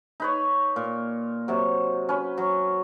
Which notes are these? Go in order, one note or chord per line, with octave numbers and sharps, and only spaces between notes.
D#4 B4 C#5
A#2
C3 F#3
C#4 B4
F#3